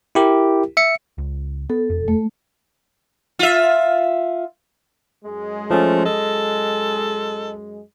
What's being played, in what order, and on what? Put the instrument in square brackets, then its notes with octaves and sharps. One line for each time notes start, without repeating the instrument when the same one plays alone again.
[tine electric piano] E4 G4 A#4
E5 C#7
[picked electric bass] C#2
[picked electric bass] B3 [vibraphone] A4
[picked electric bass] E1 F2
[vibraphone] A3
[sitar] F4 E5
[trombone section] F#2 G#3
[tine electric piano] F3 C#4 [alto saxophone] A3
[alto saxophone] A4 [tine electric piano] D#5